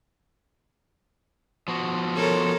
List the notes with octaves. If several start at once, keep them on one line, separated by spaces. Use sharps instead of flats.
F3 B3 F#4
A4 A#4 C#5